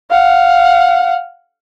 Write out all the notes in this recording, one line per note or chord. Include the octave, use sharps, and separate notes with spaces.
F5 F#5